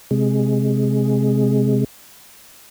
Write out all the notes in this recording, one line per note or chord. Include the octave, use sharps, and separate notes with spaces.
C3 G#3